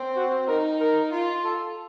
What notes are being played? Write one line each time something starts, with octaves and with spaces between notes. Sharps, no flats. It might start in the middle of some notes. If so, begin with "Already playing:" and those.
Already playing: C4
F#4
D#4 A#4
A#4
F4
A4